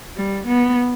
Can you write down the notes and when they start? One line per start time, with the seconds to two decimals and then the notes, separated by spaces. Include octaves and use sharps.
0.15 G3
0.47 B3